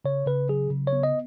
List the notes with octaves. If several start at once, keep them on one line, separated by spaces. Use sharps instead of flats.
C#3 C#5
C#3 B4
F#3 G#4
C#3
C#5
B3
D#5